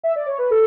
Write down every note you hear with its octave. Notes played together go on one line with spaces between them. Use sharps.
E5
D5
C#5
B4
A4